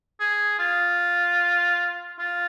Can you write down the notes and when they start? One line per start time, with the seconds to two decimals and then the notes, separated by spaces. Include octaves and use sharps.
0.20 G#4
0.59 F4
2.19 F4